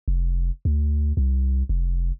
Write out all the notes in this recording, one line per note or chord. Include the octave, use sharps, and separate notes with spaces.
F1
D2
C2
F1